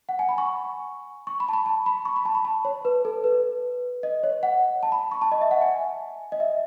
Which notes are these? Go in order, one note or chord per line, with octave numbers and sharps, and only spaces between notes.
F#5
G#5
B5
C#6
C#6
B5
A5
B5
A5
B5
C#6
B5
A5
B5
A5
C#5
B4
A4
B4
D#5
C#5
F#5
A5
B5
C#6
A5
D#5
E5
F#5
G#5
D#5
E5